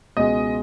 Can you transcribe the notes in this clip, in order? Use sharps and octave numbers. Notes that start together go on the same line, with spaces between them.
C#2 B2 G#3 D#5